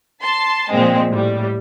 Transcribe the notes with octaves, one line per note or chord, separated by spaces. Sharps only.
A5 C6
A#2 F3 G#3 C4
A2 G3